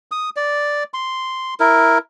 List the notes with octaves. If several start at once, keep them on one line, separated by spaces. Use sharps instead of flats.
D#6
D5
C6
E4 A#4